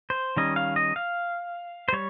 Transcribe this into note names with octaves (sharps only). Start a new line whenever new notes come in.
C5
D#3 G3 C#4 D#5
F5
D#5
F5
C5
G3 C#5